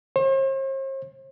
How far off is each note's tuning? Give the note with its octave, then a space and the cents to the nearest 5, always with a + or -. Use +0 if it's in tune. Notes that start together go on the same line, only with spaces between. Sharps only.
C5 +45